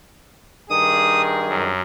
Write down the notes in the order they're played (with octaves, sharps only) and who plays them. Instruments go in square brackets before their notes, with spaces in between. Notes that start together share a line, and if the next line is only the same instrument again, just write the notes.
[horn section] G2 D#3 G#4 [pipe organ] D#6
[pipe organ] F#2